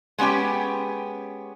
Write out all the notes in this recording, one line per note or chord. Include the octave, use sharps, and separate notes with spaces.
G#3 B3 C#4 G4 G5